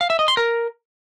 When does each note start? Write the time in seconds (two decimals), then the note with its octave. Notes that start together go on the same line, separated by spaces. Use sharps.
0.01 F5
0.10 E5
0.19 D#5
0.28 C6
0.37 A#4